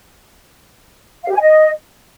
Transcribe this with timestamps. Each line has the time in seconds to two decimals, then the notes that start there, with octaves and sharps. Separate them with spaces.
1.24 F5
1.29 G4
1.35 G#5
1.41 D#5